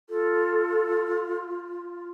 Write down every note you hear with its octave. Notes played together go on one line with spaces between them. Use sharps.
F4 A4